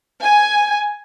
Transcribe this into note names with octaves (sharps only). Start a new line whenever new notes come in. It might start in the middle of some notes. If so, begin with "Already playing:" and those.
G#5